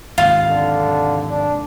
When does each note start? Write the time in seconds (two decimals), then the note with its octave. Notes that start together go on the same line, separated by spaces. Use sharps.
0.18 D#2 G#2 C3 F4
0.50 D3
1.29 D4